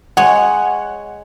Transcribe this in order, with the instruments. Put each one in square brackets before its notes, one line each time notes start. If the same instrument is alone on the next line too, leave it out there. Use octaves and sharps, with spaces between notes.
[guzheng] G#3 C#5 [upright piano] F#5